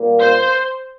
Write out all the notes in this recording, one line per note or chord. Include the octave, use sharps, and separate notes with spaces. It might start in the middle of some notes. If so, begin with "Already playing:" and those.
Already playing: A#2 G3 A#3 F4
C5